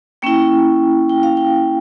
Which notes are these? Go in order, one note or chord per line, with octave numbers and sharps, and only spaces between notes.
A#3 C#4 E4 G5
G5
F5
G5